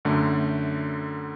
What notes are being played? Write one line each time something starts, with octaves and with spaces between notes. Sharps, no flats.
F#2 D3 A3